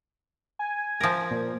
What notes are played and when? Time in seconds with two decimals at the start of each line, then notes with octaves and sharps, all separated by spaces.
0.59 G#5
1.01 F3 A#4
1.31 A#2